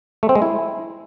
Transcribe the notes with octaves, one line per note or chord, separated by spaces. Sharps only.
A3
C4
G#3
E4